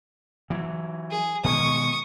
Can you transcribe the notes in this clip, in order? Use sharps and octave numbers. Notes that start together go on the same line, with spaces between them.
E3 F#3
G#4
B2 D#3 G#3 C#6 D#6